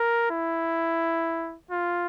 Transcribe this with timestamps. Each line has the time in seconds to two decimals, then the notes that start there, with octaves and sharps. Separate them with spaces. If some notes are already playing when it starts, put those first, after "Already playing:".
Already playing: A#4
0.31 E4
1.71 F4